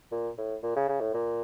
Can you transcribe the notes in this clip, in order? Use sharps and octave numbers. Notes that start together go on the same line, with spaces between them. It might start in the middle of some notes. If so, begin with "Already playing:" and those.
A#2
A2
A#2
C#3
C#3
A2
A#2